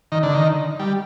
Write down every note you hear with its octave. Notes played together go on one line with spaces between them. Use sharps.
D#3
D3
D#3
G3